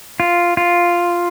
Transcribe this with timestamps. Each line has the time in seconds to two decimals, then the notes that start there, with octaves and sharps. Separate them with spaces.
0.20 F4
0.57 F4